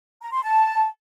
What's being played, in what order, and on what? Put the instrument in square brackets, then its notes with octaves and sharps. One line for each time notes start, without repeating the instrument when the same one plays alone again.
[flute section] A#5
C6
A5